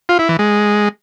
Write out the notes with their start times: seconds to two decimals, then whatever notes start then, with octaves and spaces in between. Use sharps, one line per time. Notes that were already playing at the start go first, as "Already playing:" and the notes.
0.09 F4
0.19 E4
0.29 E3
0.39 G#3